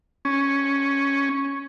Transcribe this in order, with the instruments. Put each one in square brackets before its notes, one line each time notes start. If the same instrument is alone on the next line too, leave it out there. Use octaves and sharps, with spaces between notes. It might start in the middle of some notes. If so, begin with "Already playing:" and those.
[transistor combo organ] C#4